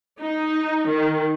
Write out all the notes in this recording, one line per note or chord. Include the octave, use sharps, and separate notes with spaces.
D#4
D#3